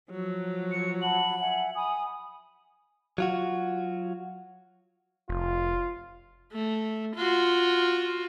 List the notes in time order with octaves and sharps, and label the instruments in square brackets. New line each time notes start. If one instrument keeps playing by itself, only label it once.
[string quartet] F3 F#3
[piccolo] C#7
[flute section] F#5 A5 B5 [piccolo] F#7
[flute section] E5 F#5 G#5
[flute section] G#5 B5 [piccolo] D#6
[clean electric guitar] F#3 F4 F#4
[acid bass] F1 [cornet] F4
[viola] A3
F4 F#4